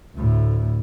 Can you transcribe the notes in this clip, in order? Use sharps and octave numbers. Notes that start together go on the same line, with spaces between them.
D2 A2